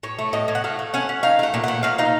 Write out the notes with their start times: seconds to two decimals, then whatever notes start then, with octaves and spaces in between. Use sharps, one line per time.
0.03 A2 C#5
0.19 A3
0.33 A2 D#5
0.48 A2
0.55 F#5
0.64 A3 F5
0.79 A3
0.94 C#4 F#5
1.09 C#4
1.23 D#4 F5
1.39 A3 F#5
1.54 A#2
1.64 A3 F#5
1.83 A#2 F5
1.98 D#4 F5